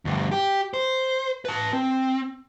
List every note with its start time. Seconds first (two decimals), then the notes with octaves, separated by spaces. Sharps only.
0.05 D2 G2
0.32 G4
0.74 C5
1.45 B4 A5
1.73 C4